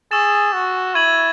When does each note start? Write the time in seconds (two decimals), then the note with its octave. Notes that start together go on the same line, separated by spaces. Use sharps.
0.11 G#4 C#6 E6 A6 E7
0.53 F#4
0.95 E4 G#6 D#7 F#7